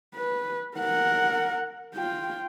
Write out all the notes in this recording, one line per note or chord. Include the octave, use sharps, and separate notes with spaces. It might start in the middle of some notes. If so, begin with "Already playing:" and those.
B4
A#4 F#5
F4 G5